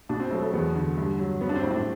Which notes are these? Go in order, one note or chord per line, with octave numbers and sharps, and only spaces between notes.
B2 D4
C4
F#3 A3
A3
E2 B3
D3
G2
F#3
F#3 B3
D4
C4
A2
D4